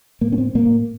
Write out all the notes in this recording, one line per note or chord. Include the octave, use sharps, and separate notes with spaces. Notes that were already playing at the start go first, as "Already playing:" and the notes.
A2 A#3
C#4
C4
A2 A#3